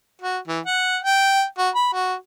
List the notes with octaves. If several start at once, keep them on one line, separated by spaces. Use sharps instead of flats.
F#4
E3
F#5
G5
F#4
B5
F#4